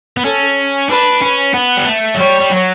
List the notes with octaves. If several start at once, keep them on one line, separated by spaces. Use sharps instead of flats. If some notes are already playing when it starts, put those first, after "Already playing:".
B3
C#4 A4
D4 B4
C#4
B3
G3
A3
F#3
G3 C#5
G3
F#3